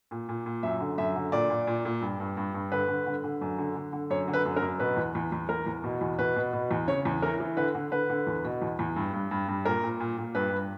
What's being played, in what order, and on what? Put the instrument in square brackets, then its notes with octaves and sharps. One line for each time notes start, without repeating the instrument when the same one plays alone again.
[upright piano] A#2
A#2
A#2
F#2 E5
D3
F#2 E5
D3
A#2 D5
A#2
A#2
A#2
G2
G2
G2
G2
D3 B4
D3
D3
D3
F#2
D3
D3
D3
F#2 C#5
D3
B4
F#2
A#4
F#2
B2 B4
E2
E2
E2
E2 A#4
E2
B2
E2
B2 B4
B2
B2
E2
C#3 C#5
E2
E3 A#4
E3
D3 B4
D3
D3 B4
D3
E2
B2
E2
E2
G2
G2
G2
G2
A#2 A#4
A#2
A#2
A#2
G2 B4
G2